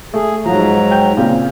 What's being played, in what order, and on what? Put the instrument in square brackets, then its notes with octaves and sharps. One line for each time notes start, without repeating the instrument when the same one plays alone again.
[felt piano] A3 [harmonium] G#4
[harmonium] G#2 F#3 A#5 [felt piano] F3 F#5
[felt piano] G5 G6
A#2 C#3 C4